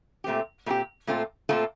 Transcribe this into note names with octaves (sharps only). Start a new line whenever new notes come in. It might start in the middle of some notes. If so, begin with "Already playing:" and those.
A#2 A3 C4 G4
A#2 A3 C4 G4
A#2 A3 C4 F4 A4
A#2 A3 C4 F4 A4